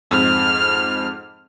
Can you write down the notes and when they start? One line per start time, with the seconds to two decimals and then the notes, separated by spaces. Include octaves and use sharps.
0.11 F2 G#2 C4 F6